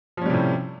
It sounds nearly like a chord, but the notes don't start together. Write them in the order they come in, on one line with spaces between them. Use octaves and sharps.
F3 C#4 G3 C3 A2